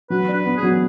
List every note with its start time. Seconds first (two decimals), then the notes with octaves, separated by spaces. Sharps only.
0.10 F#3 B4
0.28 D4
0.34 B4
0.45 B3
0.57 G#4
0.63 F#3